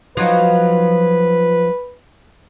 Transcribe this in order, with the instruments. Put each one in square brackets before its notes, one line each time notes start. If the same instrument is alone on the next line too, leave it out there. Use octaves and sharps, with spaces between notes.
[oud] F3 F#3 D#4 [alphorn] B4